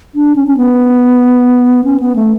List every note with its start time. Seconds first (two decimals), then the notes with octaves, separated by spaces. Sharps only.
0.15 D4
0.36 C#4
0.47 C#4
0.57 B3
1.84 C#4
2.00 B3
2.16 A3